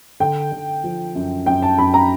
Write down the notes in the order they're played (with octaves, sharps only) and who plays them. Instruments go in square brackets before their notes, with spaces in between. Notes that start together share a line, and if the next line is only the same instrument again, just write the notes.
[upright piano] D3 G5
D3
F3
F#2
F#2 G5
A5
F#2 B5
A#5